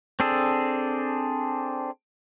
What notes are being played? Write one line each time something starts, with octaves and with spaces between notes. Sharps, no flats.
C4 D4 G#4 A4